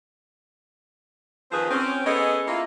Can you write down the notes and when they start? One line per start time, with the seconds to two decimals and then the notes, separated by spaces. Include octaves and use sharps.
1.51 D#3 F3 C4 G#4 B4 C5
1.70 C4 C#4
2.06 B3 C#4 G#4 A4 D#5
2.47 A#3 E4 F4